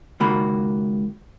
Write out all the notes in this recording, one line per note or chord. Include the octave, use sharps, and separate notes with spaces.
C#2 D#3 A#3 F#4 B5